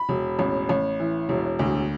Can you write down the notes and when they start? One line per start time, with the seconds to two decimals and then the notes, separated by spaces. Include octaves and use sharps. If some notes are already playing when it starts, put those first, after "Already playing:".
Already playing: B5
0.09 E1
0.39 A1
0.69 A1
1.00 E3
1.29 E1
1.59 D2